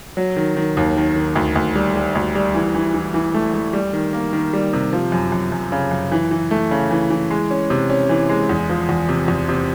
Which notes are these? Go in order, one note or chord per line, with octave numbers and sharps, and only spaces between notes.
F#3
D#3
D#3
D#2
D#3
D#3
D2
D2
G3
G3
D2
G3
E3
E3
E3
E3
A3
A3
G3
D#3
A#3
D#3
G3
C3
F3
F#2
F#2
F#2
C#3
F#2
E3
E3
A3
C#3
E3
E3
G#3
C#4
C3
C#4
E3
G#3
E2
F3
E2
C3
E2
C3